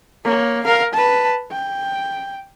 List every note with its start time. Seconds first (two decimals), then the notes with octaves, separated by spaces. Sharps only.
0.25 A#3 C#5
0.64 A#4 F5
0.94 B4 A5
1.52 G5